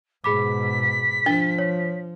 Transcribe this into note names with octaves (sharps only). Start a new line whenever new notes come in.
G#2 B2 G#4 B5 D6 B6
F3 D4 G7
C#5